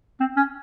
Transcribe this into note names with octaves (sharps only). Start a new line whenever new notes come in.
C4
C#4